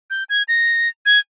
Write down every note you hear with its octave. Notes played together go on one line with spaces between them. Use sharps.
G6
G#6
A#6
G#6